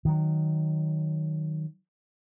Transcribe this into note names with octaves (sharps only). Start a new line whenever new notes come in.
D#3 F#3